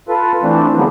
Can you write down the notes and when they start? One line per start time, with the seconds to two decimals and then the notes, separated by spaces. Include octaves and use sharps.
0.09 F4 A4 B4
0.43 E3 A3 C4 D4
0.77 D3 D#3 F3 F#3 G#3 B3